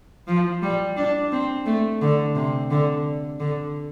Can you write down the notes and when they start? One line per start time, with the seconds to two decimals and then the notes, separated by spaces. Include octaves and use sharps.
0.28 F3
0.62 G3
0.96 D4
1.32 C4
1.66 A3
2.02 D3
2.35 C3
2.71 D3
3.40 D3